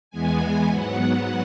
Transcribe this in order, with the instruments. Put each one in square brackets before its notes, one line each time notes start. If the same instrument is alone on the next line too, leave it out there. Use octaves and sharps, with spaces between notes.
[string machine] E2 E3 G#3 B3 G#5
G#2 F#3 B3 F#5